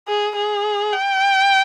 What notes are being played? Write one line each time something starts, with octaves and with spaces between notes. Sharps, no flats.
G#4
G#4
G5